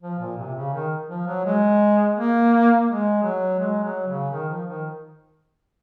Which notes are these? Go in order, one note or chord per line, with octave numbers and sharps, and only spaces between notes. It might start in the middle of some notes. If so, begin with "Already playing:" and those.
F3
A#2
C3
C#3
D#3
F3
F#3
G#3
A#3
G#3
F#3
G#3
F#3
C#3
D#3
F3
D#3